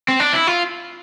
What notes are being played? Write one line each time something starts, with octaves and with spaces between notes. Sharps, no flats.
C4
D4
E4
F4